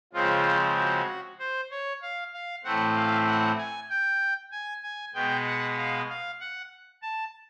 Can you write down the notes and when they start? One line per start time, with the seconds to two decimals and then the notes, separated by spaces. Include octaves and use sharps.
0.13 C#3 F3 G#3 C4 F4
0.77 F#4
1.39 C5
1.71 C#5
2.02 F5
2.33 F5
2.64 A2 E3 A3 C4 F#5
2.96 F5
3.27 F#5
3.58 G#5
3.89 G5
4.52 G#5
4.83 G#5
5.14 B2 G#3 B3 G5
5.45 F#5
5.77 F5
6.09 F5
6.40 F#5
7.02 A5